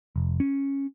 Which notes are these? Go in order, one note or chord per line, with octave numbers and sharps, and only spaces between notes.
F1
C#4